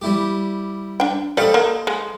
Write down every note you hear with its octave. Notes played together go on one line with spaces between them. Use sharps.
G3 E4 G4
D4 G5
G3 A4 C5 D5 D#5 F5
A#3
G#3